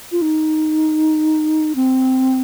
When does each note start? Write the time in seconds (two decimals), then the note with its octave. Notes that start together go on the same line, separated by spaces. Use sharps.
0.12 F4
0.22 D#4
1.76 C4